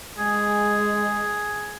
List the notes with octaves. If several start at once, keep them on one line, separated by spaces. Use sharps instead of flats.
G#3 G#4